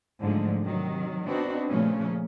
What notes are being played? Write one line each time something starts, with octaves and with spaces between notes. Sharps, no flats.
G#2 D3 F3 F#3 G#3 A3
C3 D#3 F#3
B3 C4 D4 D#4 F#4
A#2 C#3 F3 A3 C#4